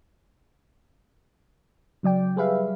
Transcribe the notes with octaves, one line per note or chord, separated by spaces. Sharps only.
C#3 F#3 D5 G5
G3 G#4 B4 E5 F5